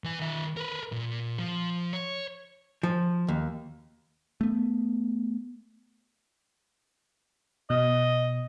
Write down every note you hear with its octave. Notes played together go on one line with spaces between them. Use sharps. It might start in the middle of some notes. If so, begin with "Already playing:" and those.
E3 G#5
D#3 E5
A#4 B4
A#2
F3
C#5
F3
D#2
A3 B3
B2 D#5